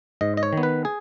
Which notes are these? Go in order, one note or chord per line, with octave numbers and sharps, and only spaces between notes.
G#2 D#5
D#5
C#5
D#3 B3
B4
G#4